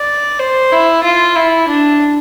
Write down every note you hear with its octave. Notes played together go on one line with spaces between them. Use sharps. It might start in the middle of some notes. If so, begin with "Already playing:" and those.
Already playing: D5
C5
E4
F4
E4
D4